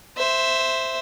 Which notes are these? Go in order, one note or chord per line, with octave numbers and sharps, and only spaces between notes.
C5 E5